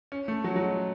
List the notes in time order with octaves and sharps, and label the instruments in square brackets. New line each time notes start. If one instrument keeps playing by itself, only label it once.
[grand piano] C#4
A3
F#3
F#3
G#3